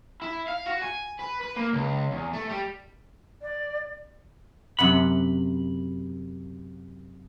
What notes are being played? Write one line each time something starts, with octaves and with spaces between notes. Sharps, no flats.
E4
F5
F#4
G#5
B4
B4
A#3
C#2
E2
A3
G3
D5
F#2 C3 F#5 B5